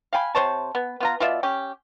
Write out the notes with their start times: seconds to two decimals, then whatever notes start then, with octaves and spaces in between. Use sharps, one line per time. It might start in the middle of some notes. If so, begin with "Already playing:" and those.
0.13 F5 G5 G#5 B5
0.35 C3 C5 C#5 A5
0.75 B3
1.00 B3 F4 A#5
1.20 B2 F4 D5 E5
1.43 C#4 G4